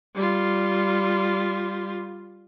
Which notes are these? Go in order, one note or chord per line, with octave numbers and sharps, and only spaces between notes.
G3 F4